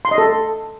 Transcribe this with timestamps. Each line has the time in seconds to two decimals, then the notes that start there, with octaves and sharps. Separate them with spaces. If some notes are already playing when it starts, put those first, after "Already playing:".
0.05 C6
0.11 D#5
0.18 A4